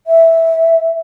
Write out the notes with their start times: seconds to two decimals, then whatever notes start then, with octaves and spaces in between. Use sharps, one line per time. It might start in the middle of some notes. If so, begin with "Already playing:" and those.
0.07 E5